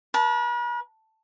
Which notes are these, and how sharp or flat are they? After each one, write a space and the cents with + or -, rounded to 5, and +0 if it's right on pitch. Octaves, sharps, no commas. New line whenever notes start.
B4 -45 A5 +0